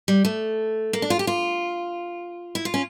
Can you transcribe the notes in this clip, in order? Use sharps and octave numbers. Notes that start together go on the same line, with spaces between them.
G3
A3
A#3
D4
F4
G4
F4
E4
F4
C#4